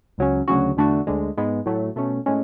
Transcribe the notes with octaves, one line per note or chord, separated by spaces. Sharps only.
C#2 C#3 F#3 C#4
D2 C#3 F#3 C#4 F#4
E2 D3 A3 D4 F#4
D2 D3 G#3
G#2 G#3 B3
A2 F#3 A3
B2 A3 C#4
A2 G#3 C#4